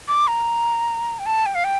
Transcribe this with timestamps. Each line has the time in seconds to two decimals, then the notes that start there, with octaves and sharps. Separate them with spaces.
0.08 D6
0.27 A#5
1.19 G5
1.26 A5
1.46 G5
1.55 F5
1.64 G5